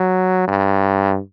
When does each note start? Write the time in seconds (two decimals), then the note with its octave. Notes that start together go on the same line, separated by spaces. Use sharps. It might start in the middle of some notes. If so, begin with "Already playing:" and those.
Already playing: F#3
0.48 G2